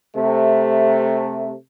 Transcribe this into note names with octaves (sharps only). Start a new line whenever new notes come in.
C3 A3